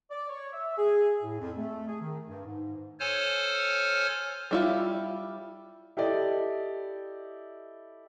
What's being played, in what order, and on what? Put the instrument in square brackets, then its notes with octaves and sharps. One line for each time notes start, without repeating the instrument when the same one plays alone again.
[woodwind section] D5
C#5
E5
G#4
A2
F2
A3
G#4
D#3
G2
G#2
[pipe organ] A4 C5 C#5 G#5 F6
[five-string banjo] G3 E4 F4
[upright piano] E4 G4 A4 D5 D#5